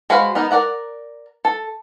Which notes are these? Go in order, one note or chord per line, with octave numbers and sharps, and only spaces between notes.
G#3 F#4 B4 C5 F5
B3 D#4 A#4
A#4 D5 F#5 A#5
A4